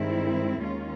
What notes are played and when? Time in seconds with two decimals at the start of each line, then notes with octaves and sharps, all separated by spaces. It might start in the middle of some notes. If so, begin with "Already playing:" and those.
Already playing: G2 D#3 G#3 C4 E4
0.62 D#2 D#3 G#3 C#4 F4